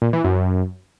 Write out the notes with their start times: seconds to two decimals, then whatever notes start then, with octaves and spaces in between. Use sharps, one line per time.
0.02 A#2
0.13 E3
0.24 F#2